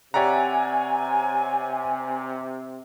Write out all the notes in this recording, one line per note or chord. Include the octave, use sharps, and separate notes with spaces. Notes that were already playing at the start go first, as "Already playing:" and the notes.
C3 G4 C#5 D5 E5 F#5 G#5 A#5